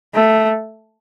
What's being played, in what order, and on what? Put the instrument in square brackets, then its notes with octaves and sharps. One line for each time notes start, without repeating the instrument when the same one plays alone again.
[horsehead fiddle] A3